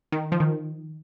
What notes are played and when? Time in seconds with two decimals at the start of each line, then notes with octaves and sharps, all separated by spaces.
0.12 D#3
0.32 F3
0.40 D#3